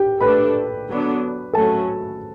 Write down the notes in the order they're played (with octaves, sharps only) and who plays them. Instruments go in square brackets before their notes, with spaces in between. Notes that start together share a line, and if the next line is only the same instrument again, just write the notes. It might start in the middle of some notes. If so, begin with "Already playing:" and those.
Already playing: [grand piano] G4 G5
[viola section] A3 D4 A4 [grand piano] B4 B5
[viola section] D3 F#3 B3 D4
[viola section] F#3 A3 C#4 F#4 [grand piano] A4 A5